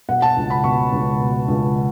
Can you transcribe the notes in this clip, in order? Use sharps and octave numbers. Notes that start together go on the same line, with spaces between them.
B2 F#5
A5
C#2
B5
B2 C#6
C#2
B2
C#2